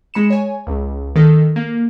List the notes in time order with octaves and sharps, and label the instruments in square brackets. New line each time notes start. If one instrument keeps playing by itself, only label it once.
[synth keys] G#3 B5 C#7 E7
C#5 G#5
C#2
D#3 A4
A#3